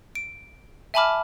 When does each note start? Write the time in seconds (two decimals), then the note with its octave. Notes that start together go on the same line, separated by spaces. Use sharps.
0.15 D7
0.94 E5 G#5 A5 B5 D6 F6